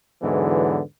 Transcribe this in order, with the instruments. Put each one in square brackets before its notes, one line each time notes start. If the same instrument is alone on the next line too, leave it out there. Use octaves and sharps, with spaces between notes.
[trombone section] E2 G#2 D3 E3 F#3 B3